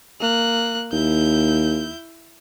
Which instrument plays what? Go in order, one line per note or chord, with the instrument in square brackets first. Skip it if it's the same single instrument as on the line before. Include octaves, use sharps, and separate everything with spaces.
[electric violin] A#3 F#6
[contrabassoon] D#2 [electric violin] E4 G6